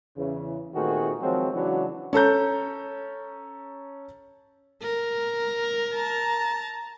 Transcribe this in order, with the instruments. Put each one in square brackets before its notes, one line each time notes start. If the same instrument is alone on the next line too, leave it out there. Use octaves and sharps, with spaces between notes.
[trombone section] E2 C#3 E3
A#2 D#3 A3 C4 F#4 G#4
D#3 F3 F#3 G#3 C4
C#3 E3 F#3 G#3 D4 F#4
[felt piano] C#4 A4 A#5 G6
[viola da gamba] A#4
[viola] A5 A#5